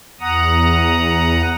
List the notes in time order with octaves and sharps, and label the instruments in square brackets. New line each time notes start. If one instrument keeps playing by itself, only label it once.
[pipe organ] E2 F#5 A#5 D#6